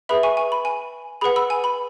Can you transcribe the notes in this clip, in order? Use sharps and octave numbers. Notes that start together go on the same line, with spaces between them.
G#4 B4 E5 B5
G#5 C#6
G#5
B5
G#5
G#4 B4 F#5 B5
B5 E6
G#5
B5